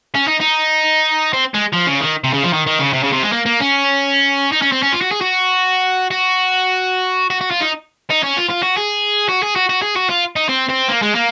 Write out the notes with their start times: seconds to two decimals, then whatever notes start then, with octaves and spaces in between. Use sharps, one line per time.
0.15 C#4
0.28 D#4
0.41 D#4
1.33 C4
1.54 G#3
1.73 F3
1.87 C#3
2.01 D#3
2.24 C3
2.33 C#3
2.44 F3
2.53 D#3
2.66 D#3
2.79 C#3
2.93 C3
3.04 C#3
3.13 C3
3.23 G#3
3.33 A#3
3.46 A#3
3.60 C#4
4.52 D#4
4.62 C#4
4.72 C4
4.83 C#4
4.92 F4
5.01 F#4
5.12 G#4
5.21 F#4
6.11 F#4
7.30 F#4
7.41 F#4
7.51 F4
7.61 D#4
8.10 D#4
8.23 C#4
8.37 F4
8.50 F4
8.63 F#4
8.77 G#4
9.29 F#4
9.43 G#4
9.56 F#4
9.69 F#4
9.82 G#4
9.96 F#4
10.09 F4
10.36 D#4
10.49 C4
10.69 C4
10.88 A#3
11.02 G#3
11.15 A#3